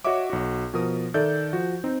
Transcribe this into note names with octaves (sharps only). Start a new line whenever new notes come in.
F#4 C#5 D#5 E5 D6
B1 F#4
B2 F3 A#4 D#6
D#3 A4 D5 E5 G6
F3 F#4
C4 D#4